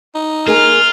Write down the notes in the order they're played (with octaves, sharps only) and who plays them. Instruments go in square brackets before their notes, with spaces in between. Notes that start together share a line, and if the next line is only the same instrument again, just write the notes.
[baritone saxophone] D#4
[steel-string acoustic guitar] A#3 G#4 A#4 [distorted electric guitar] F4 [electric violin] F6